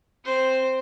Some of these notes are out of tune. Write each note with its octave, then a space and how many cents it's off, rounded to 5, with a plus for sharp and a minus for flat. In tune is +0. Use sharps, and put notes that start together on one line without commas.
C4 +0 C5 +0